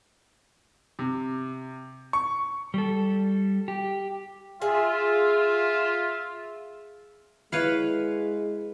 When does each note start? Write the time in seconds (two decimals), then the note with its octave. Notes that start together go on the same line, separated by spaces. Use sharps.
0.99 C3
2.13 C#6
2.74 G3 A4
3.68 G4
4.62 F4 G#4 E5
7.53 G#3 E4 B4 C#5 F5